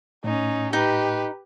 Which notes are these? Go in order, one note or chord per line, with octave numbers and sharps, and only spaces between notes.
A2 C#4 D#4
D#4 G4 B4